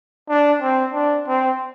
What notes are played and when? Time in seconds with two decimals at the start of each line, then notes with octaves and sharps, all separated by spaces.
0.29 D4
0.62 C4
0.94 D4
1.27 C4